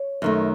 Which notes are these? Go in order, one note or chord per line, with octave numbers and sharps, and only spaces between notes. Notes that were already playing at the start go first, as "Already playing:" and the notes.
Already playing: C#5
F#2 D#3 A3